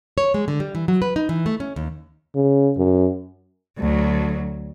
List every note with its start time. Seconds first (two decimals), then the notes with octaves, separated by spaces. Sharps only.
0.18 C#5
0.34 G#3
0.48 D3
0.60 G3
0.75 E3
0.88 F#3
1.02 B4
1.16 D#4
1.29 E3
1.46 A3
1.60 C#4
1.76 D#2
2.35 C#3
2.77 F#2
3.78 D2 F#3